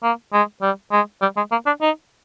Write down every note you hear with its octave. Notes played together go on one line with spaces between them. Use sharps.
A#3
G#3
G3
G#3
G3
G#3
A#3
D4
D#4